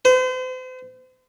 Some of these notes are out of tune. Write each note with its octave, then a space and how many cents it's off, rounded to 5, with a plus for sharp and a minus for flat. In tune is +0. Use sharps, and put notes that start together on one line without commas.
C5 -40